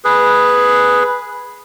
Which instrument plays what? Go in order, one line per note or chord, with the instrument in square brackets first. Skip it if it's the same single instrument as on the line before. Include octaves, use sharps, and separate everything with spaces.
[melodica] G#4 B4